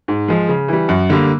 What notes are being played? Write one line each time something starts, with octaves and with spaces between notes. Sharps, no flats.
G#2
F3 G#3
C#3
E3 G3
F#2
D3 G3 A#3